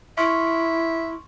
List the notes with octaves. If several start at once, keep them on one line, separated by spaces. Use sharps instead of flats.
E4 E5 C6 C#6 F6